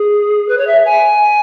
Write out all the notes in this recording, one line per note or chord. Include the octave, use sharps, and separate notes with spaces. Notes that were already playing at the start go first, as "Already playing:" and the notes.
Already playing: G#4
B4
C#5
E5
G#5